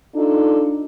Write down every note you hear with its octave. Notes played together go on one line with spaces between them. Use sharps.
D4 D#4 F4 A4